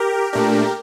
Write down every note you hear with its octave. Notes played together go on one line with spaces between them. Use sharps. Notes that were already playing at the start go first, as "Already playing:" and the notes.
Already playing: G4 A#4
A#2 A3 D4 G4 A#4